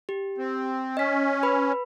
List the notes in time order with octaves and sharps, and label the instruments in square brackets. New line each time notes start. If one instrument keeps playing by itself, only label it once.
[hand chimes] G4
[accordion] C4
[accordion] C#4 [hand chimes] D#5 B6
[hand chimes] B4 B5